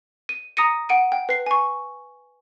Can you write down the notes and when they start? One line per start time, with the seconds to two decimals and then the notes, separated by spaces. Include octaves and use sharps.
0.29 D#7
0.57 A#5 D#6 A#6 C#7 D#7
0.89 F#5 D7 D#7
1.12 G5
1.29 B4 C7
1.46 G#5 C#6